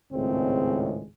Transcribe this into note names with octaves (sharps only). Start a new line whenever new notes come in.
G#1 C#2 A2 G#3 C4